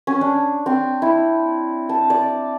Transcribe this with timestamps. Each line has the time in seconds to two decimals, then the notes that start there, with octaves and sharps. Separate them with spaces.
0.07 C#4
0.21 D4
0.66 C4
1.02 E4
1.89 A5
2.10 D5